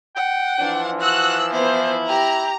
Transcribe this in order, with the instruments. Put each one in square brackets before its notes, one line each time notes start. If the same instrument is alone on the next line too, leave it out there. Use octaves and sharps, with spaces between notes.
[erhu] F#5 [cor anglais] G5
[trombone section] E3 F3 [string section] D4
[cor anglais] F#4 [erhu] E6 [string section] F#6
[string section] B3 [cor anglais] E4 [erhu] C5
[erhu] G4 [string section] A#5